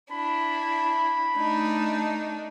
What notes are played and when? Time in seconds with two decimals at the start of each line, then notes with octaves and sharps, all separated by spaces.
0.11 D4 E4 B5
1.36 A3 D4 D#4